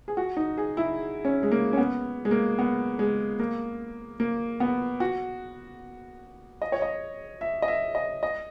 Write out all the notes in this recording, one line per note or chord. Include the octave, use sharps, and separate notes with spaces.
G#4
F#4
D#4
G#4
E4
C#4
G#3
A#3
C#4
B3
G#3
A#3
B3
G#3
A#3
A#3
B3
F#4
D#5
C#5
D#5
E5
D#5
E5
D#5
D#5